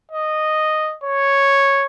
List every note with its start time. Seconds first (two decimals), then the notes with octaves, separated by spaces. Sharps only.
0.12 D#5
1.04 C#5